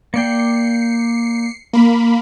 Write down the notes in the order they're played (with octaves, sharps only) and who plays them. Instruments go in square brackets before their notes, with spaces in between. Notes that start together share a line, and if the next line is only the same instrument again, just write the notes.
[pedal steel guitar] A#3 D5 G5 [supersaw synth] C7 C#7
[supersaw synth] A#3 B5